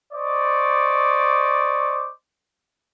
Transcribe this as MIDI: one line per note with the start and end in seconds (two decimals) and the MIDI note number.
0.13 2.09 72
0.13 2.09 74
0.13 2.09 75
0.13 2.09 85
0.13 2.09 86